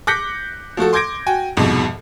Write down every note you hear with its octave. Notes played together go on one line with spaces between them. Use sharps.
D6 F#6 G6 A#6 B6 C#7
F3 A3 F#4 A4
C6 D6 G6 G#6 A#6 D7
F#4 G5 G#5
C2 F2 G#2 B2